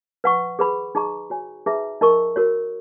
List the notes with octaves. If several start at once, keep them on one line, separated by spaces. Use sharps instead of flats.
B4 F#5 C#6
G#4 B4 F#5 B5
D#4 G#4 D#5 A#5 C#6
F#4 C#5 G#5
D#4 G#4 B4 E5 A#5
D#4 A#4 D#5 A#5 C#6
F#4 A#4 C#5